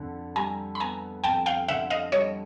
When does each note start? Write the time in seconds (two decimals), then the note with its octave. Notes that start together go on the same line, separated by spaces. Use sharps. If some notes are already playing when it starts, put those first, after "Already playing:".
Already playing: F2 D3
0.36 G3 G#5 A#5
0.75 B5
0.80 B3 G#5 A#5
1.24 F2 G5 A5
1.46 F5 G5
1.68 D3 E5 F#5
1.90 D#5 F5
2.12 G3 C#5 D#5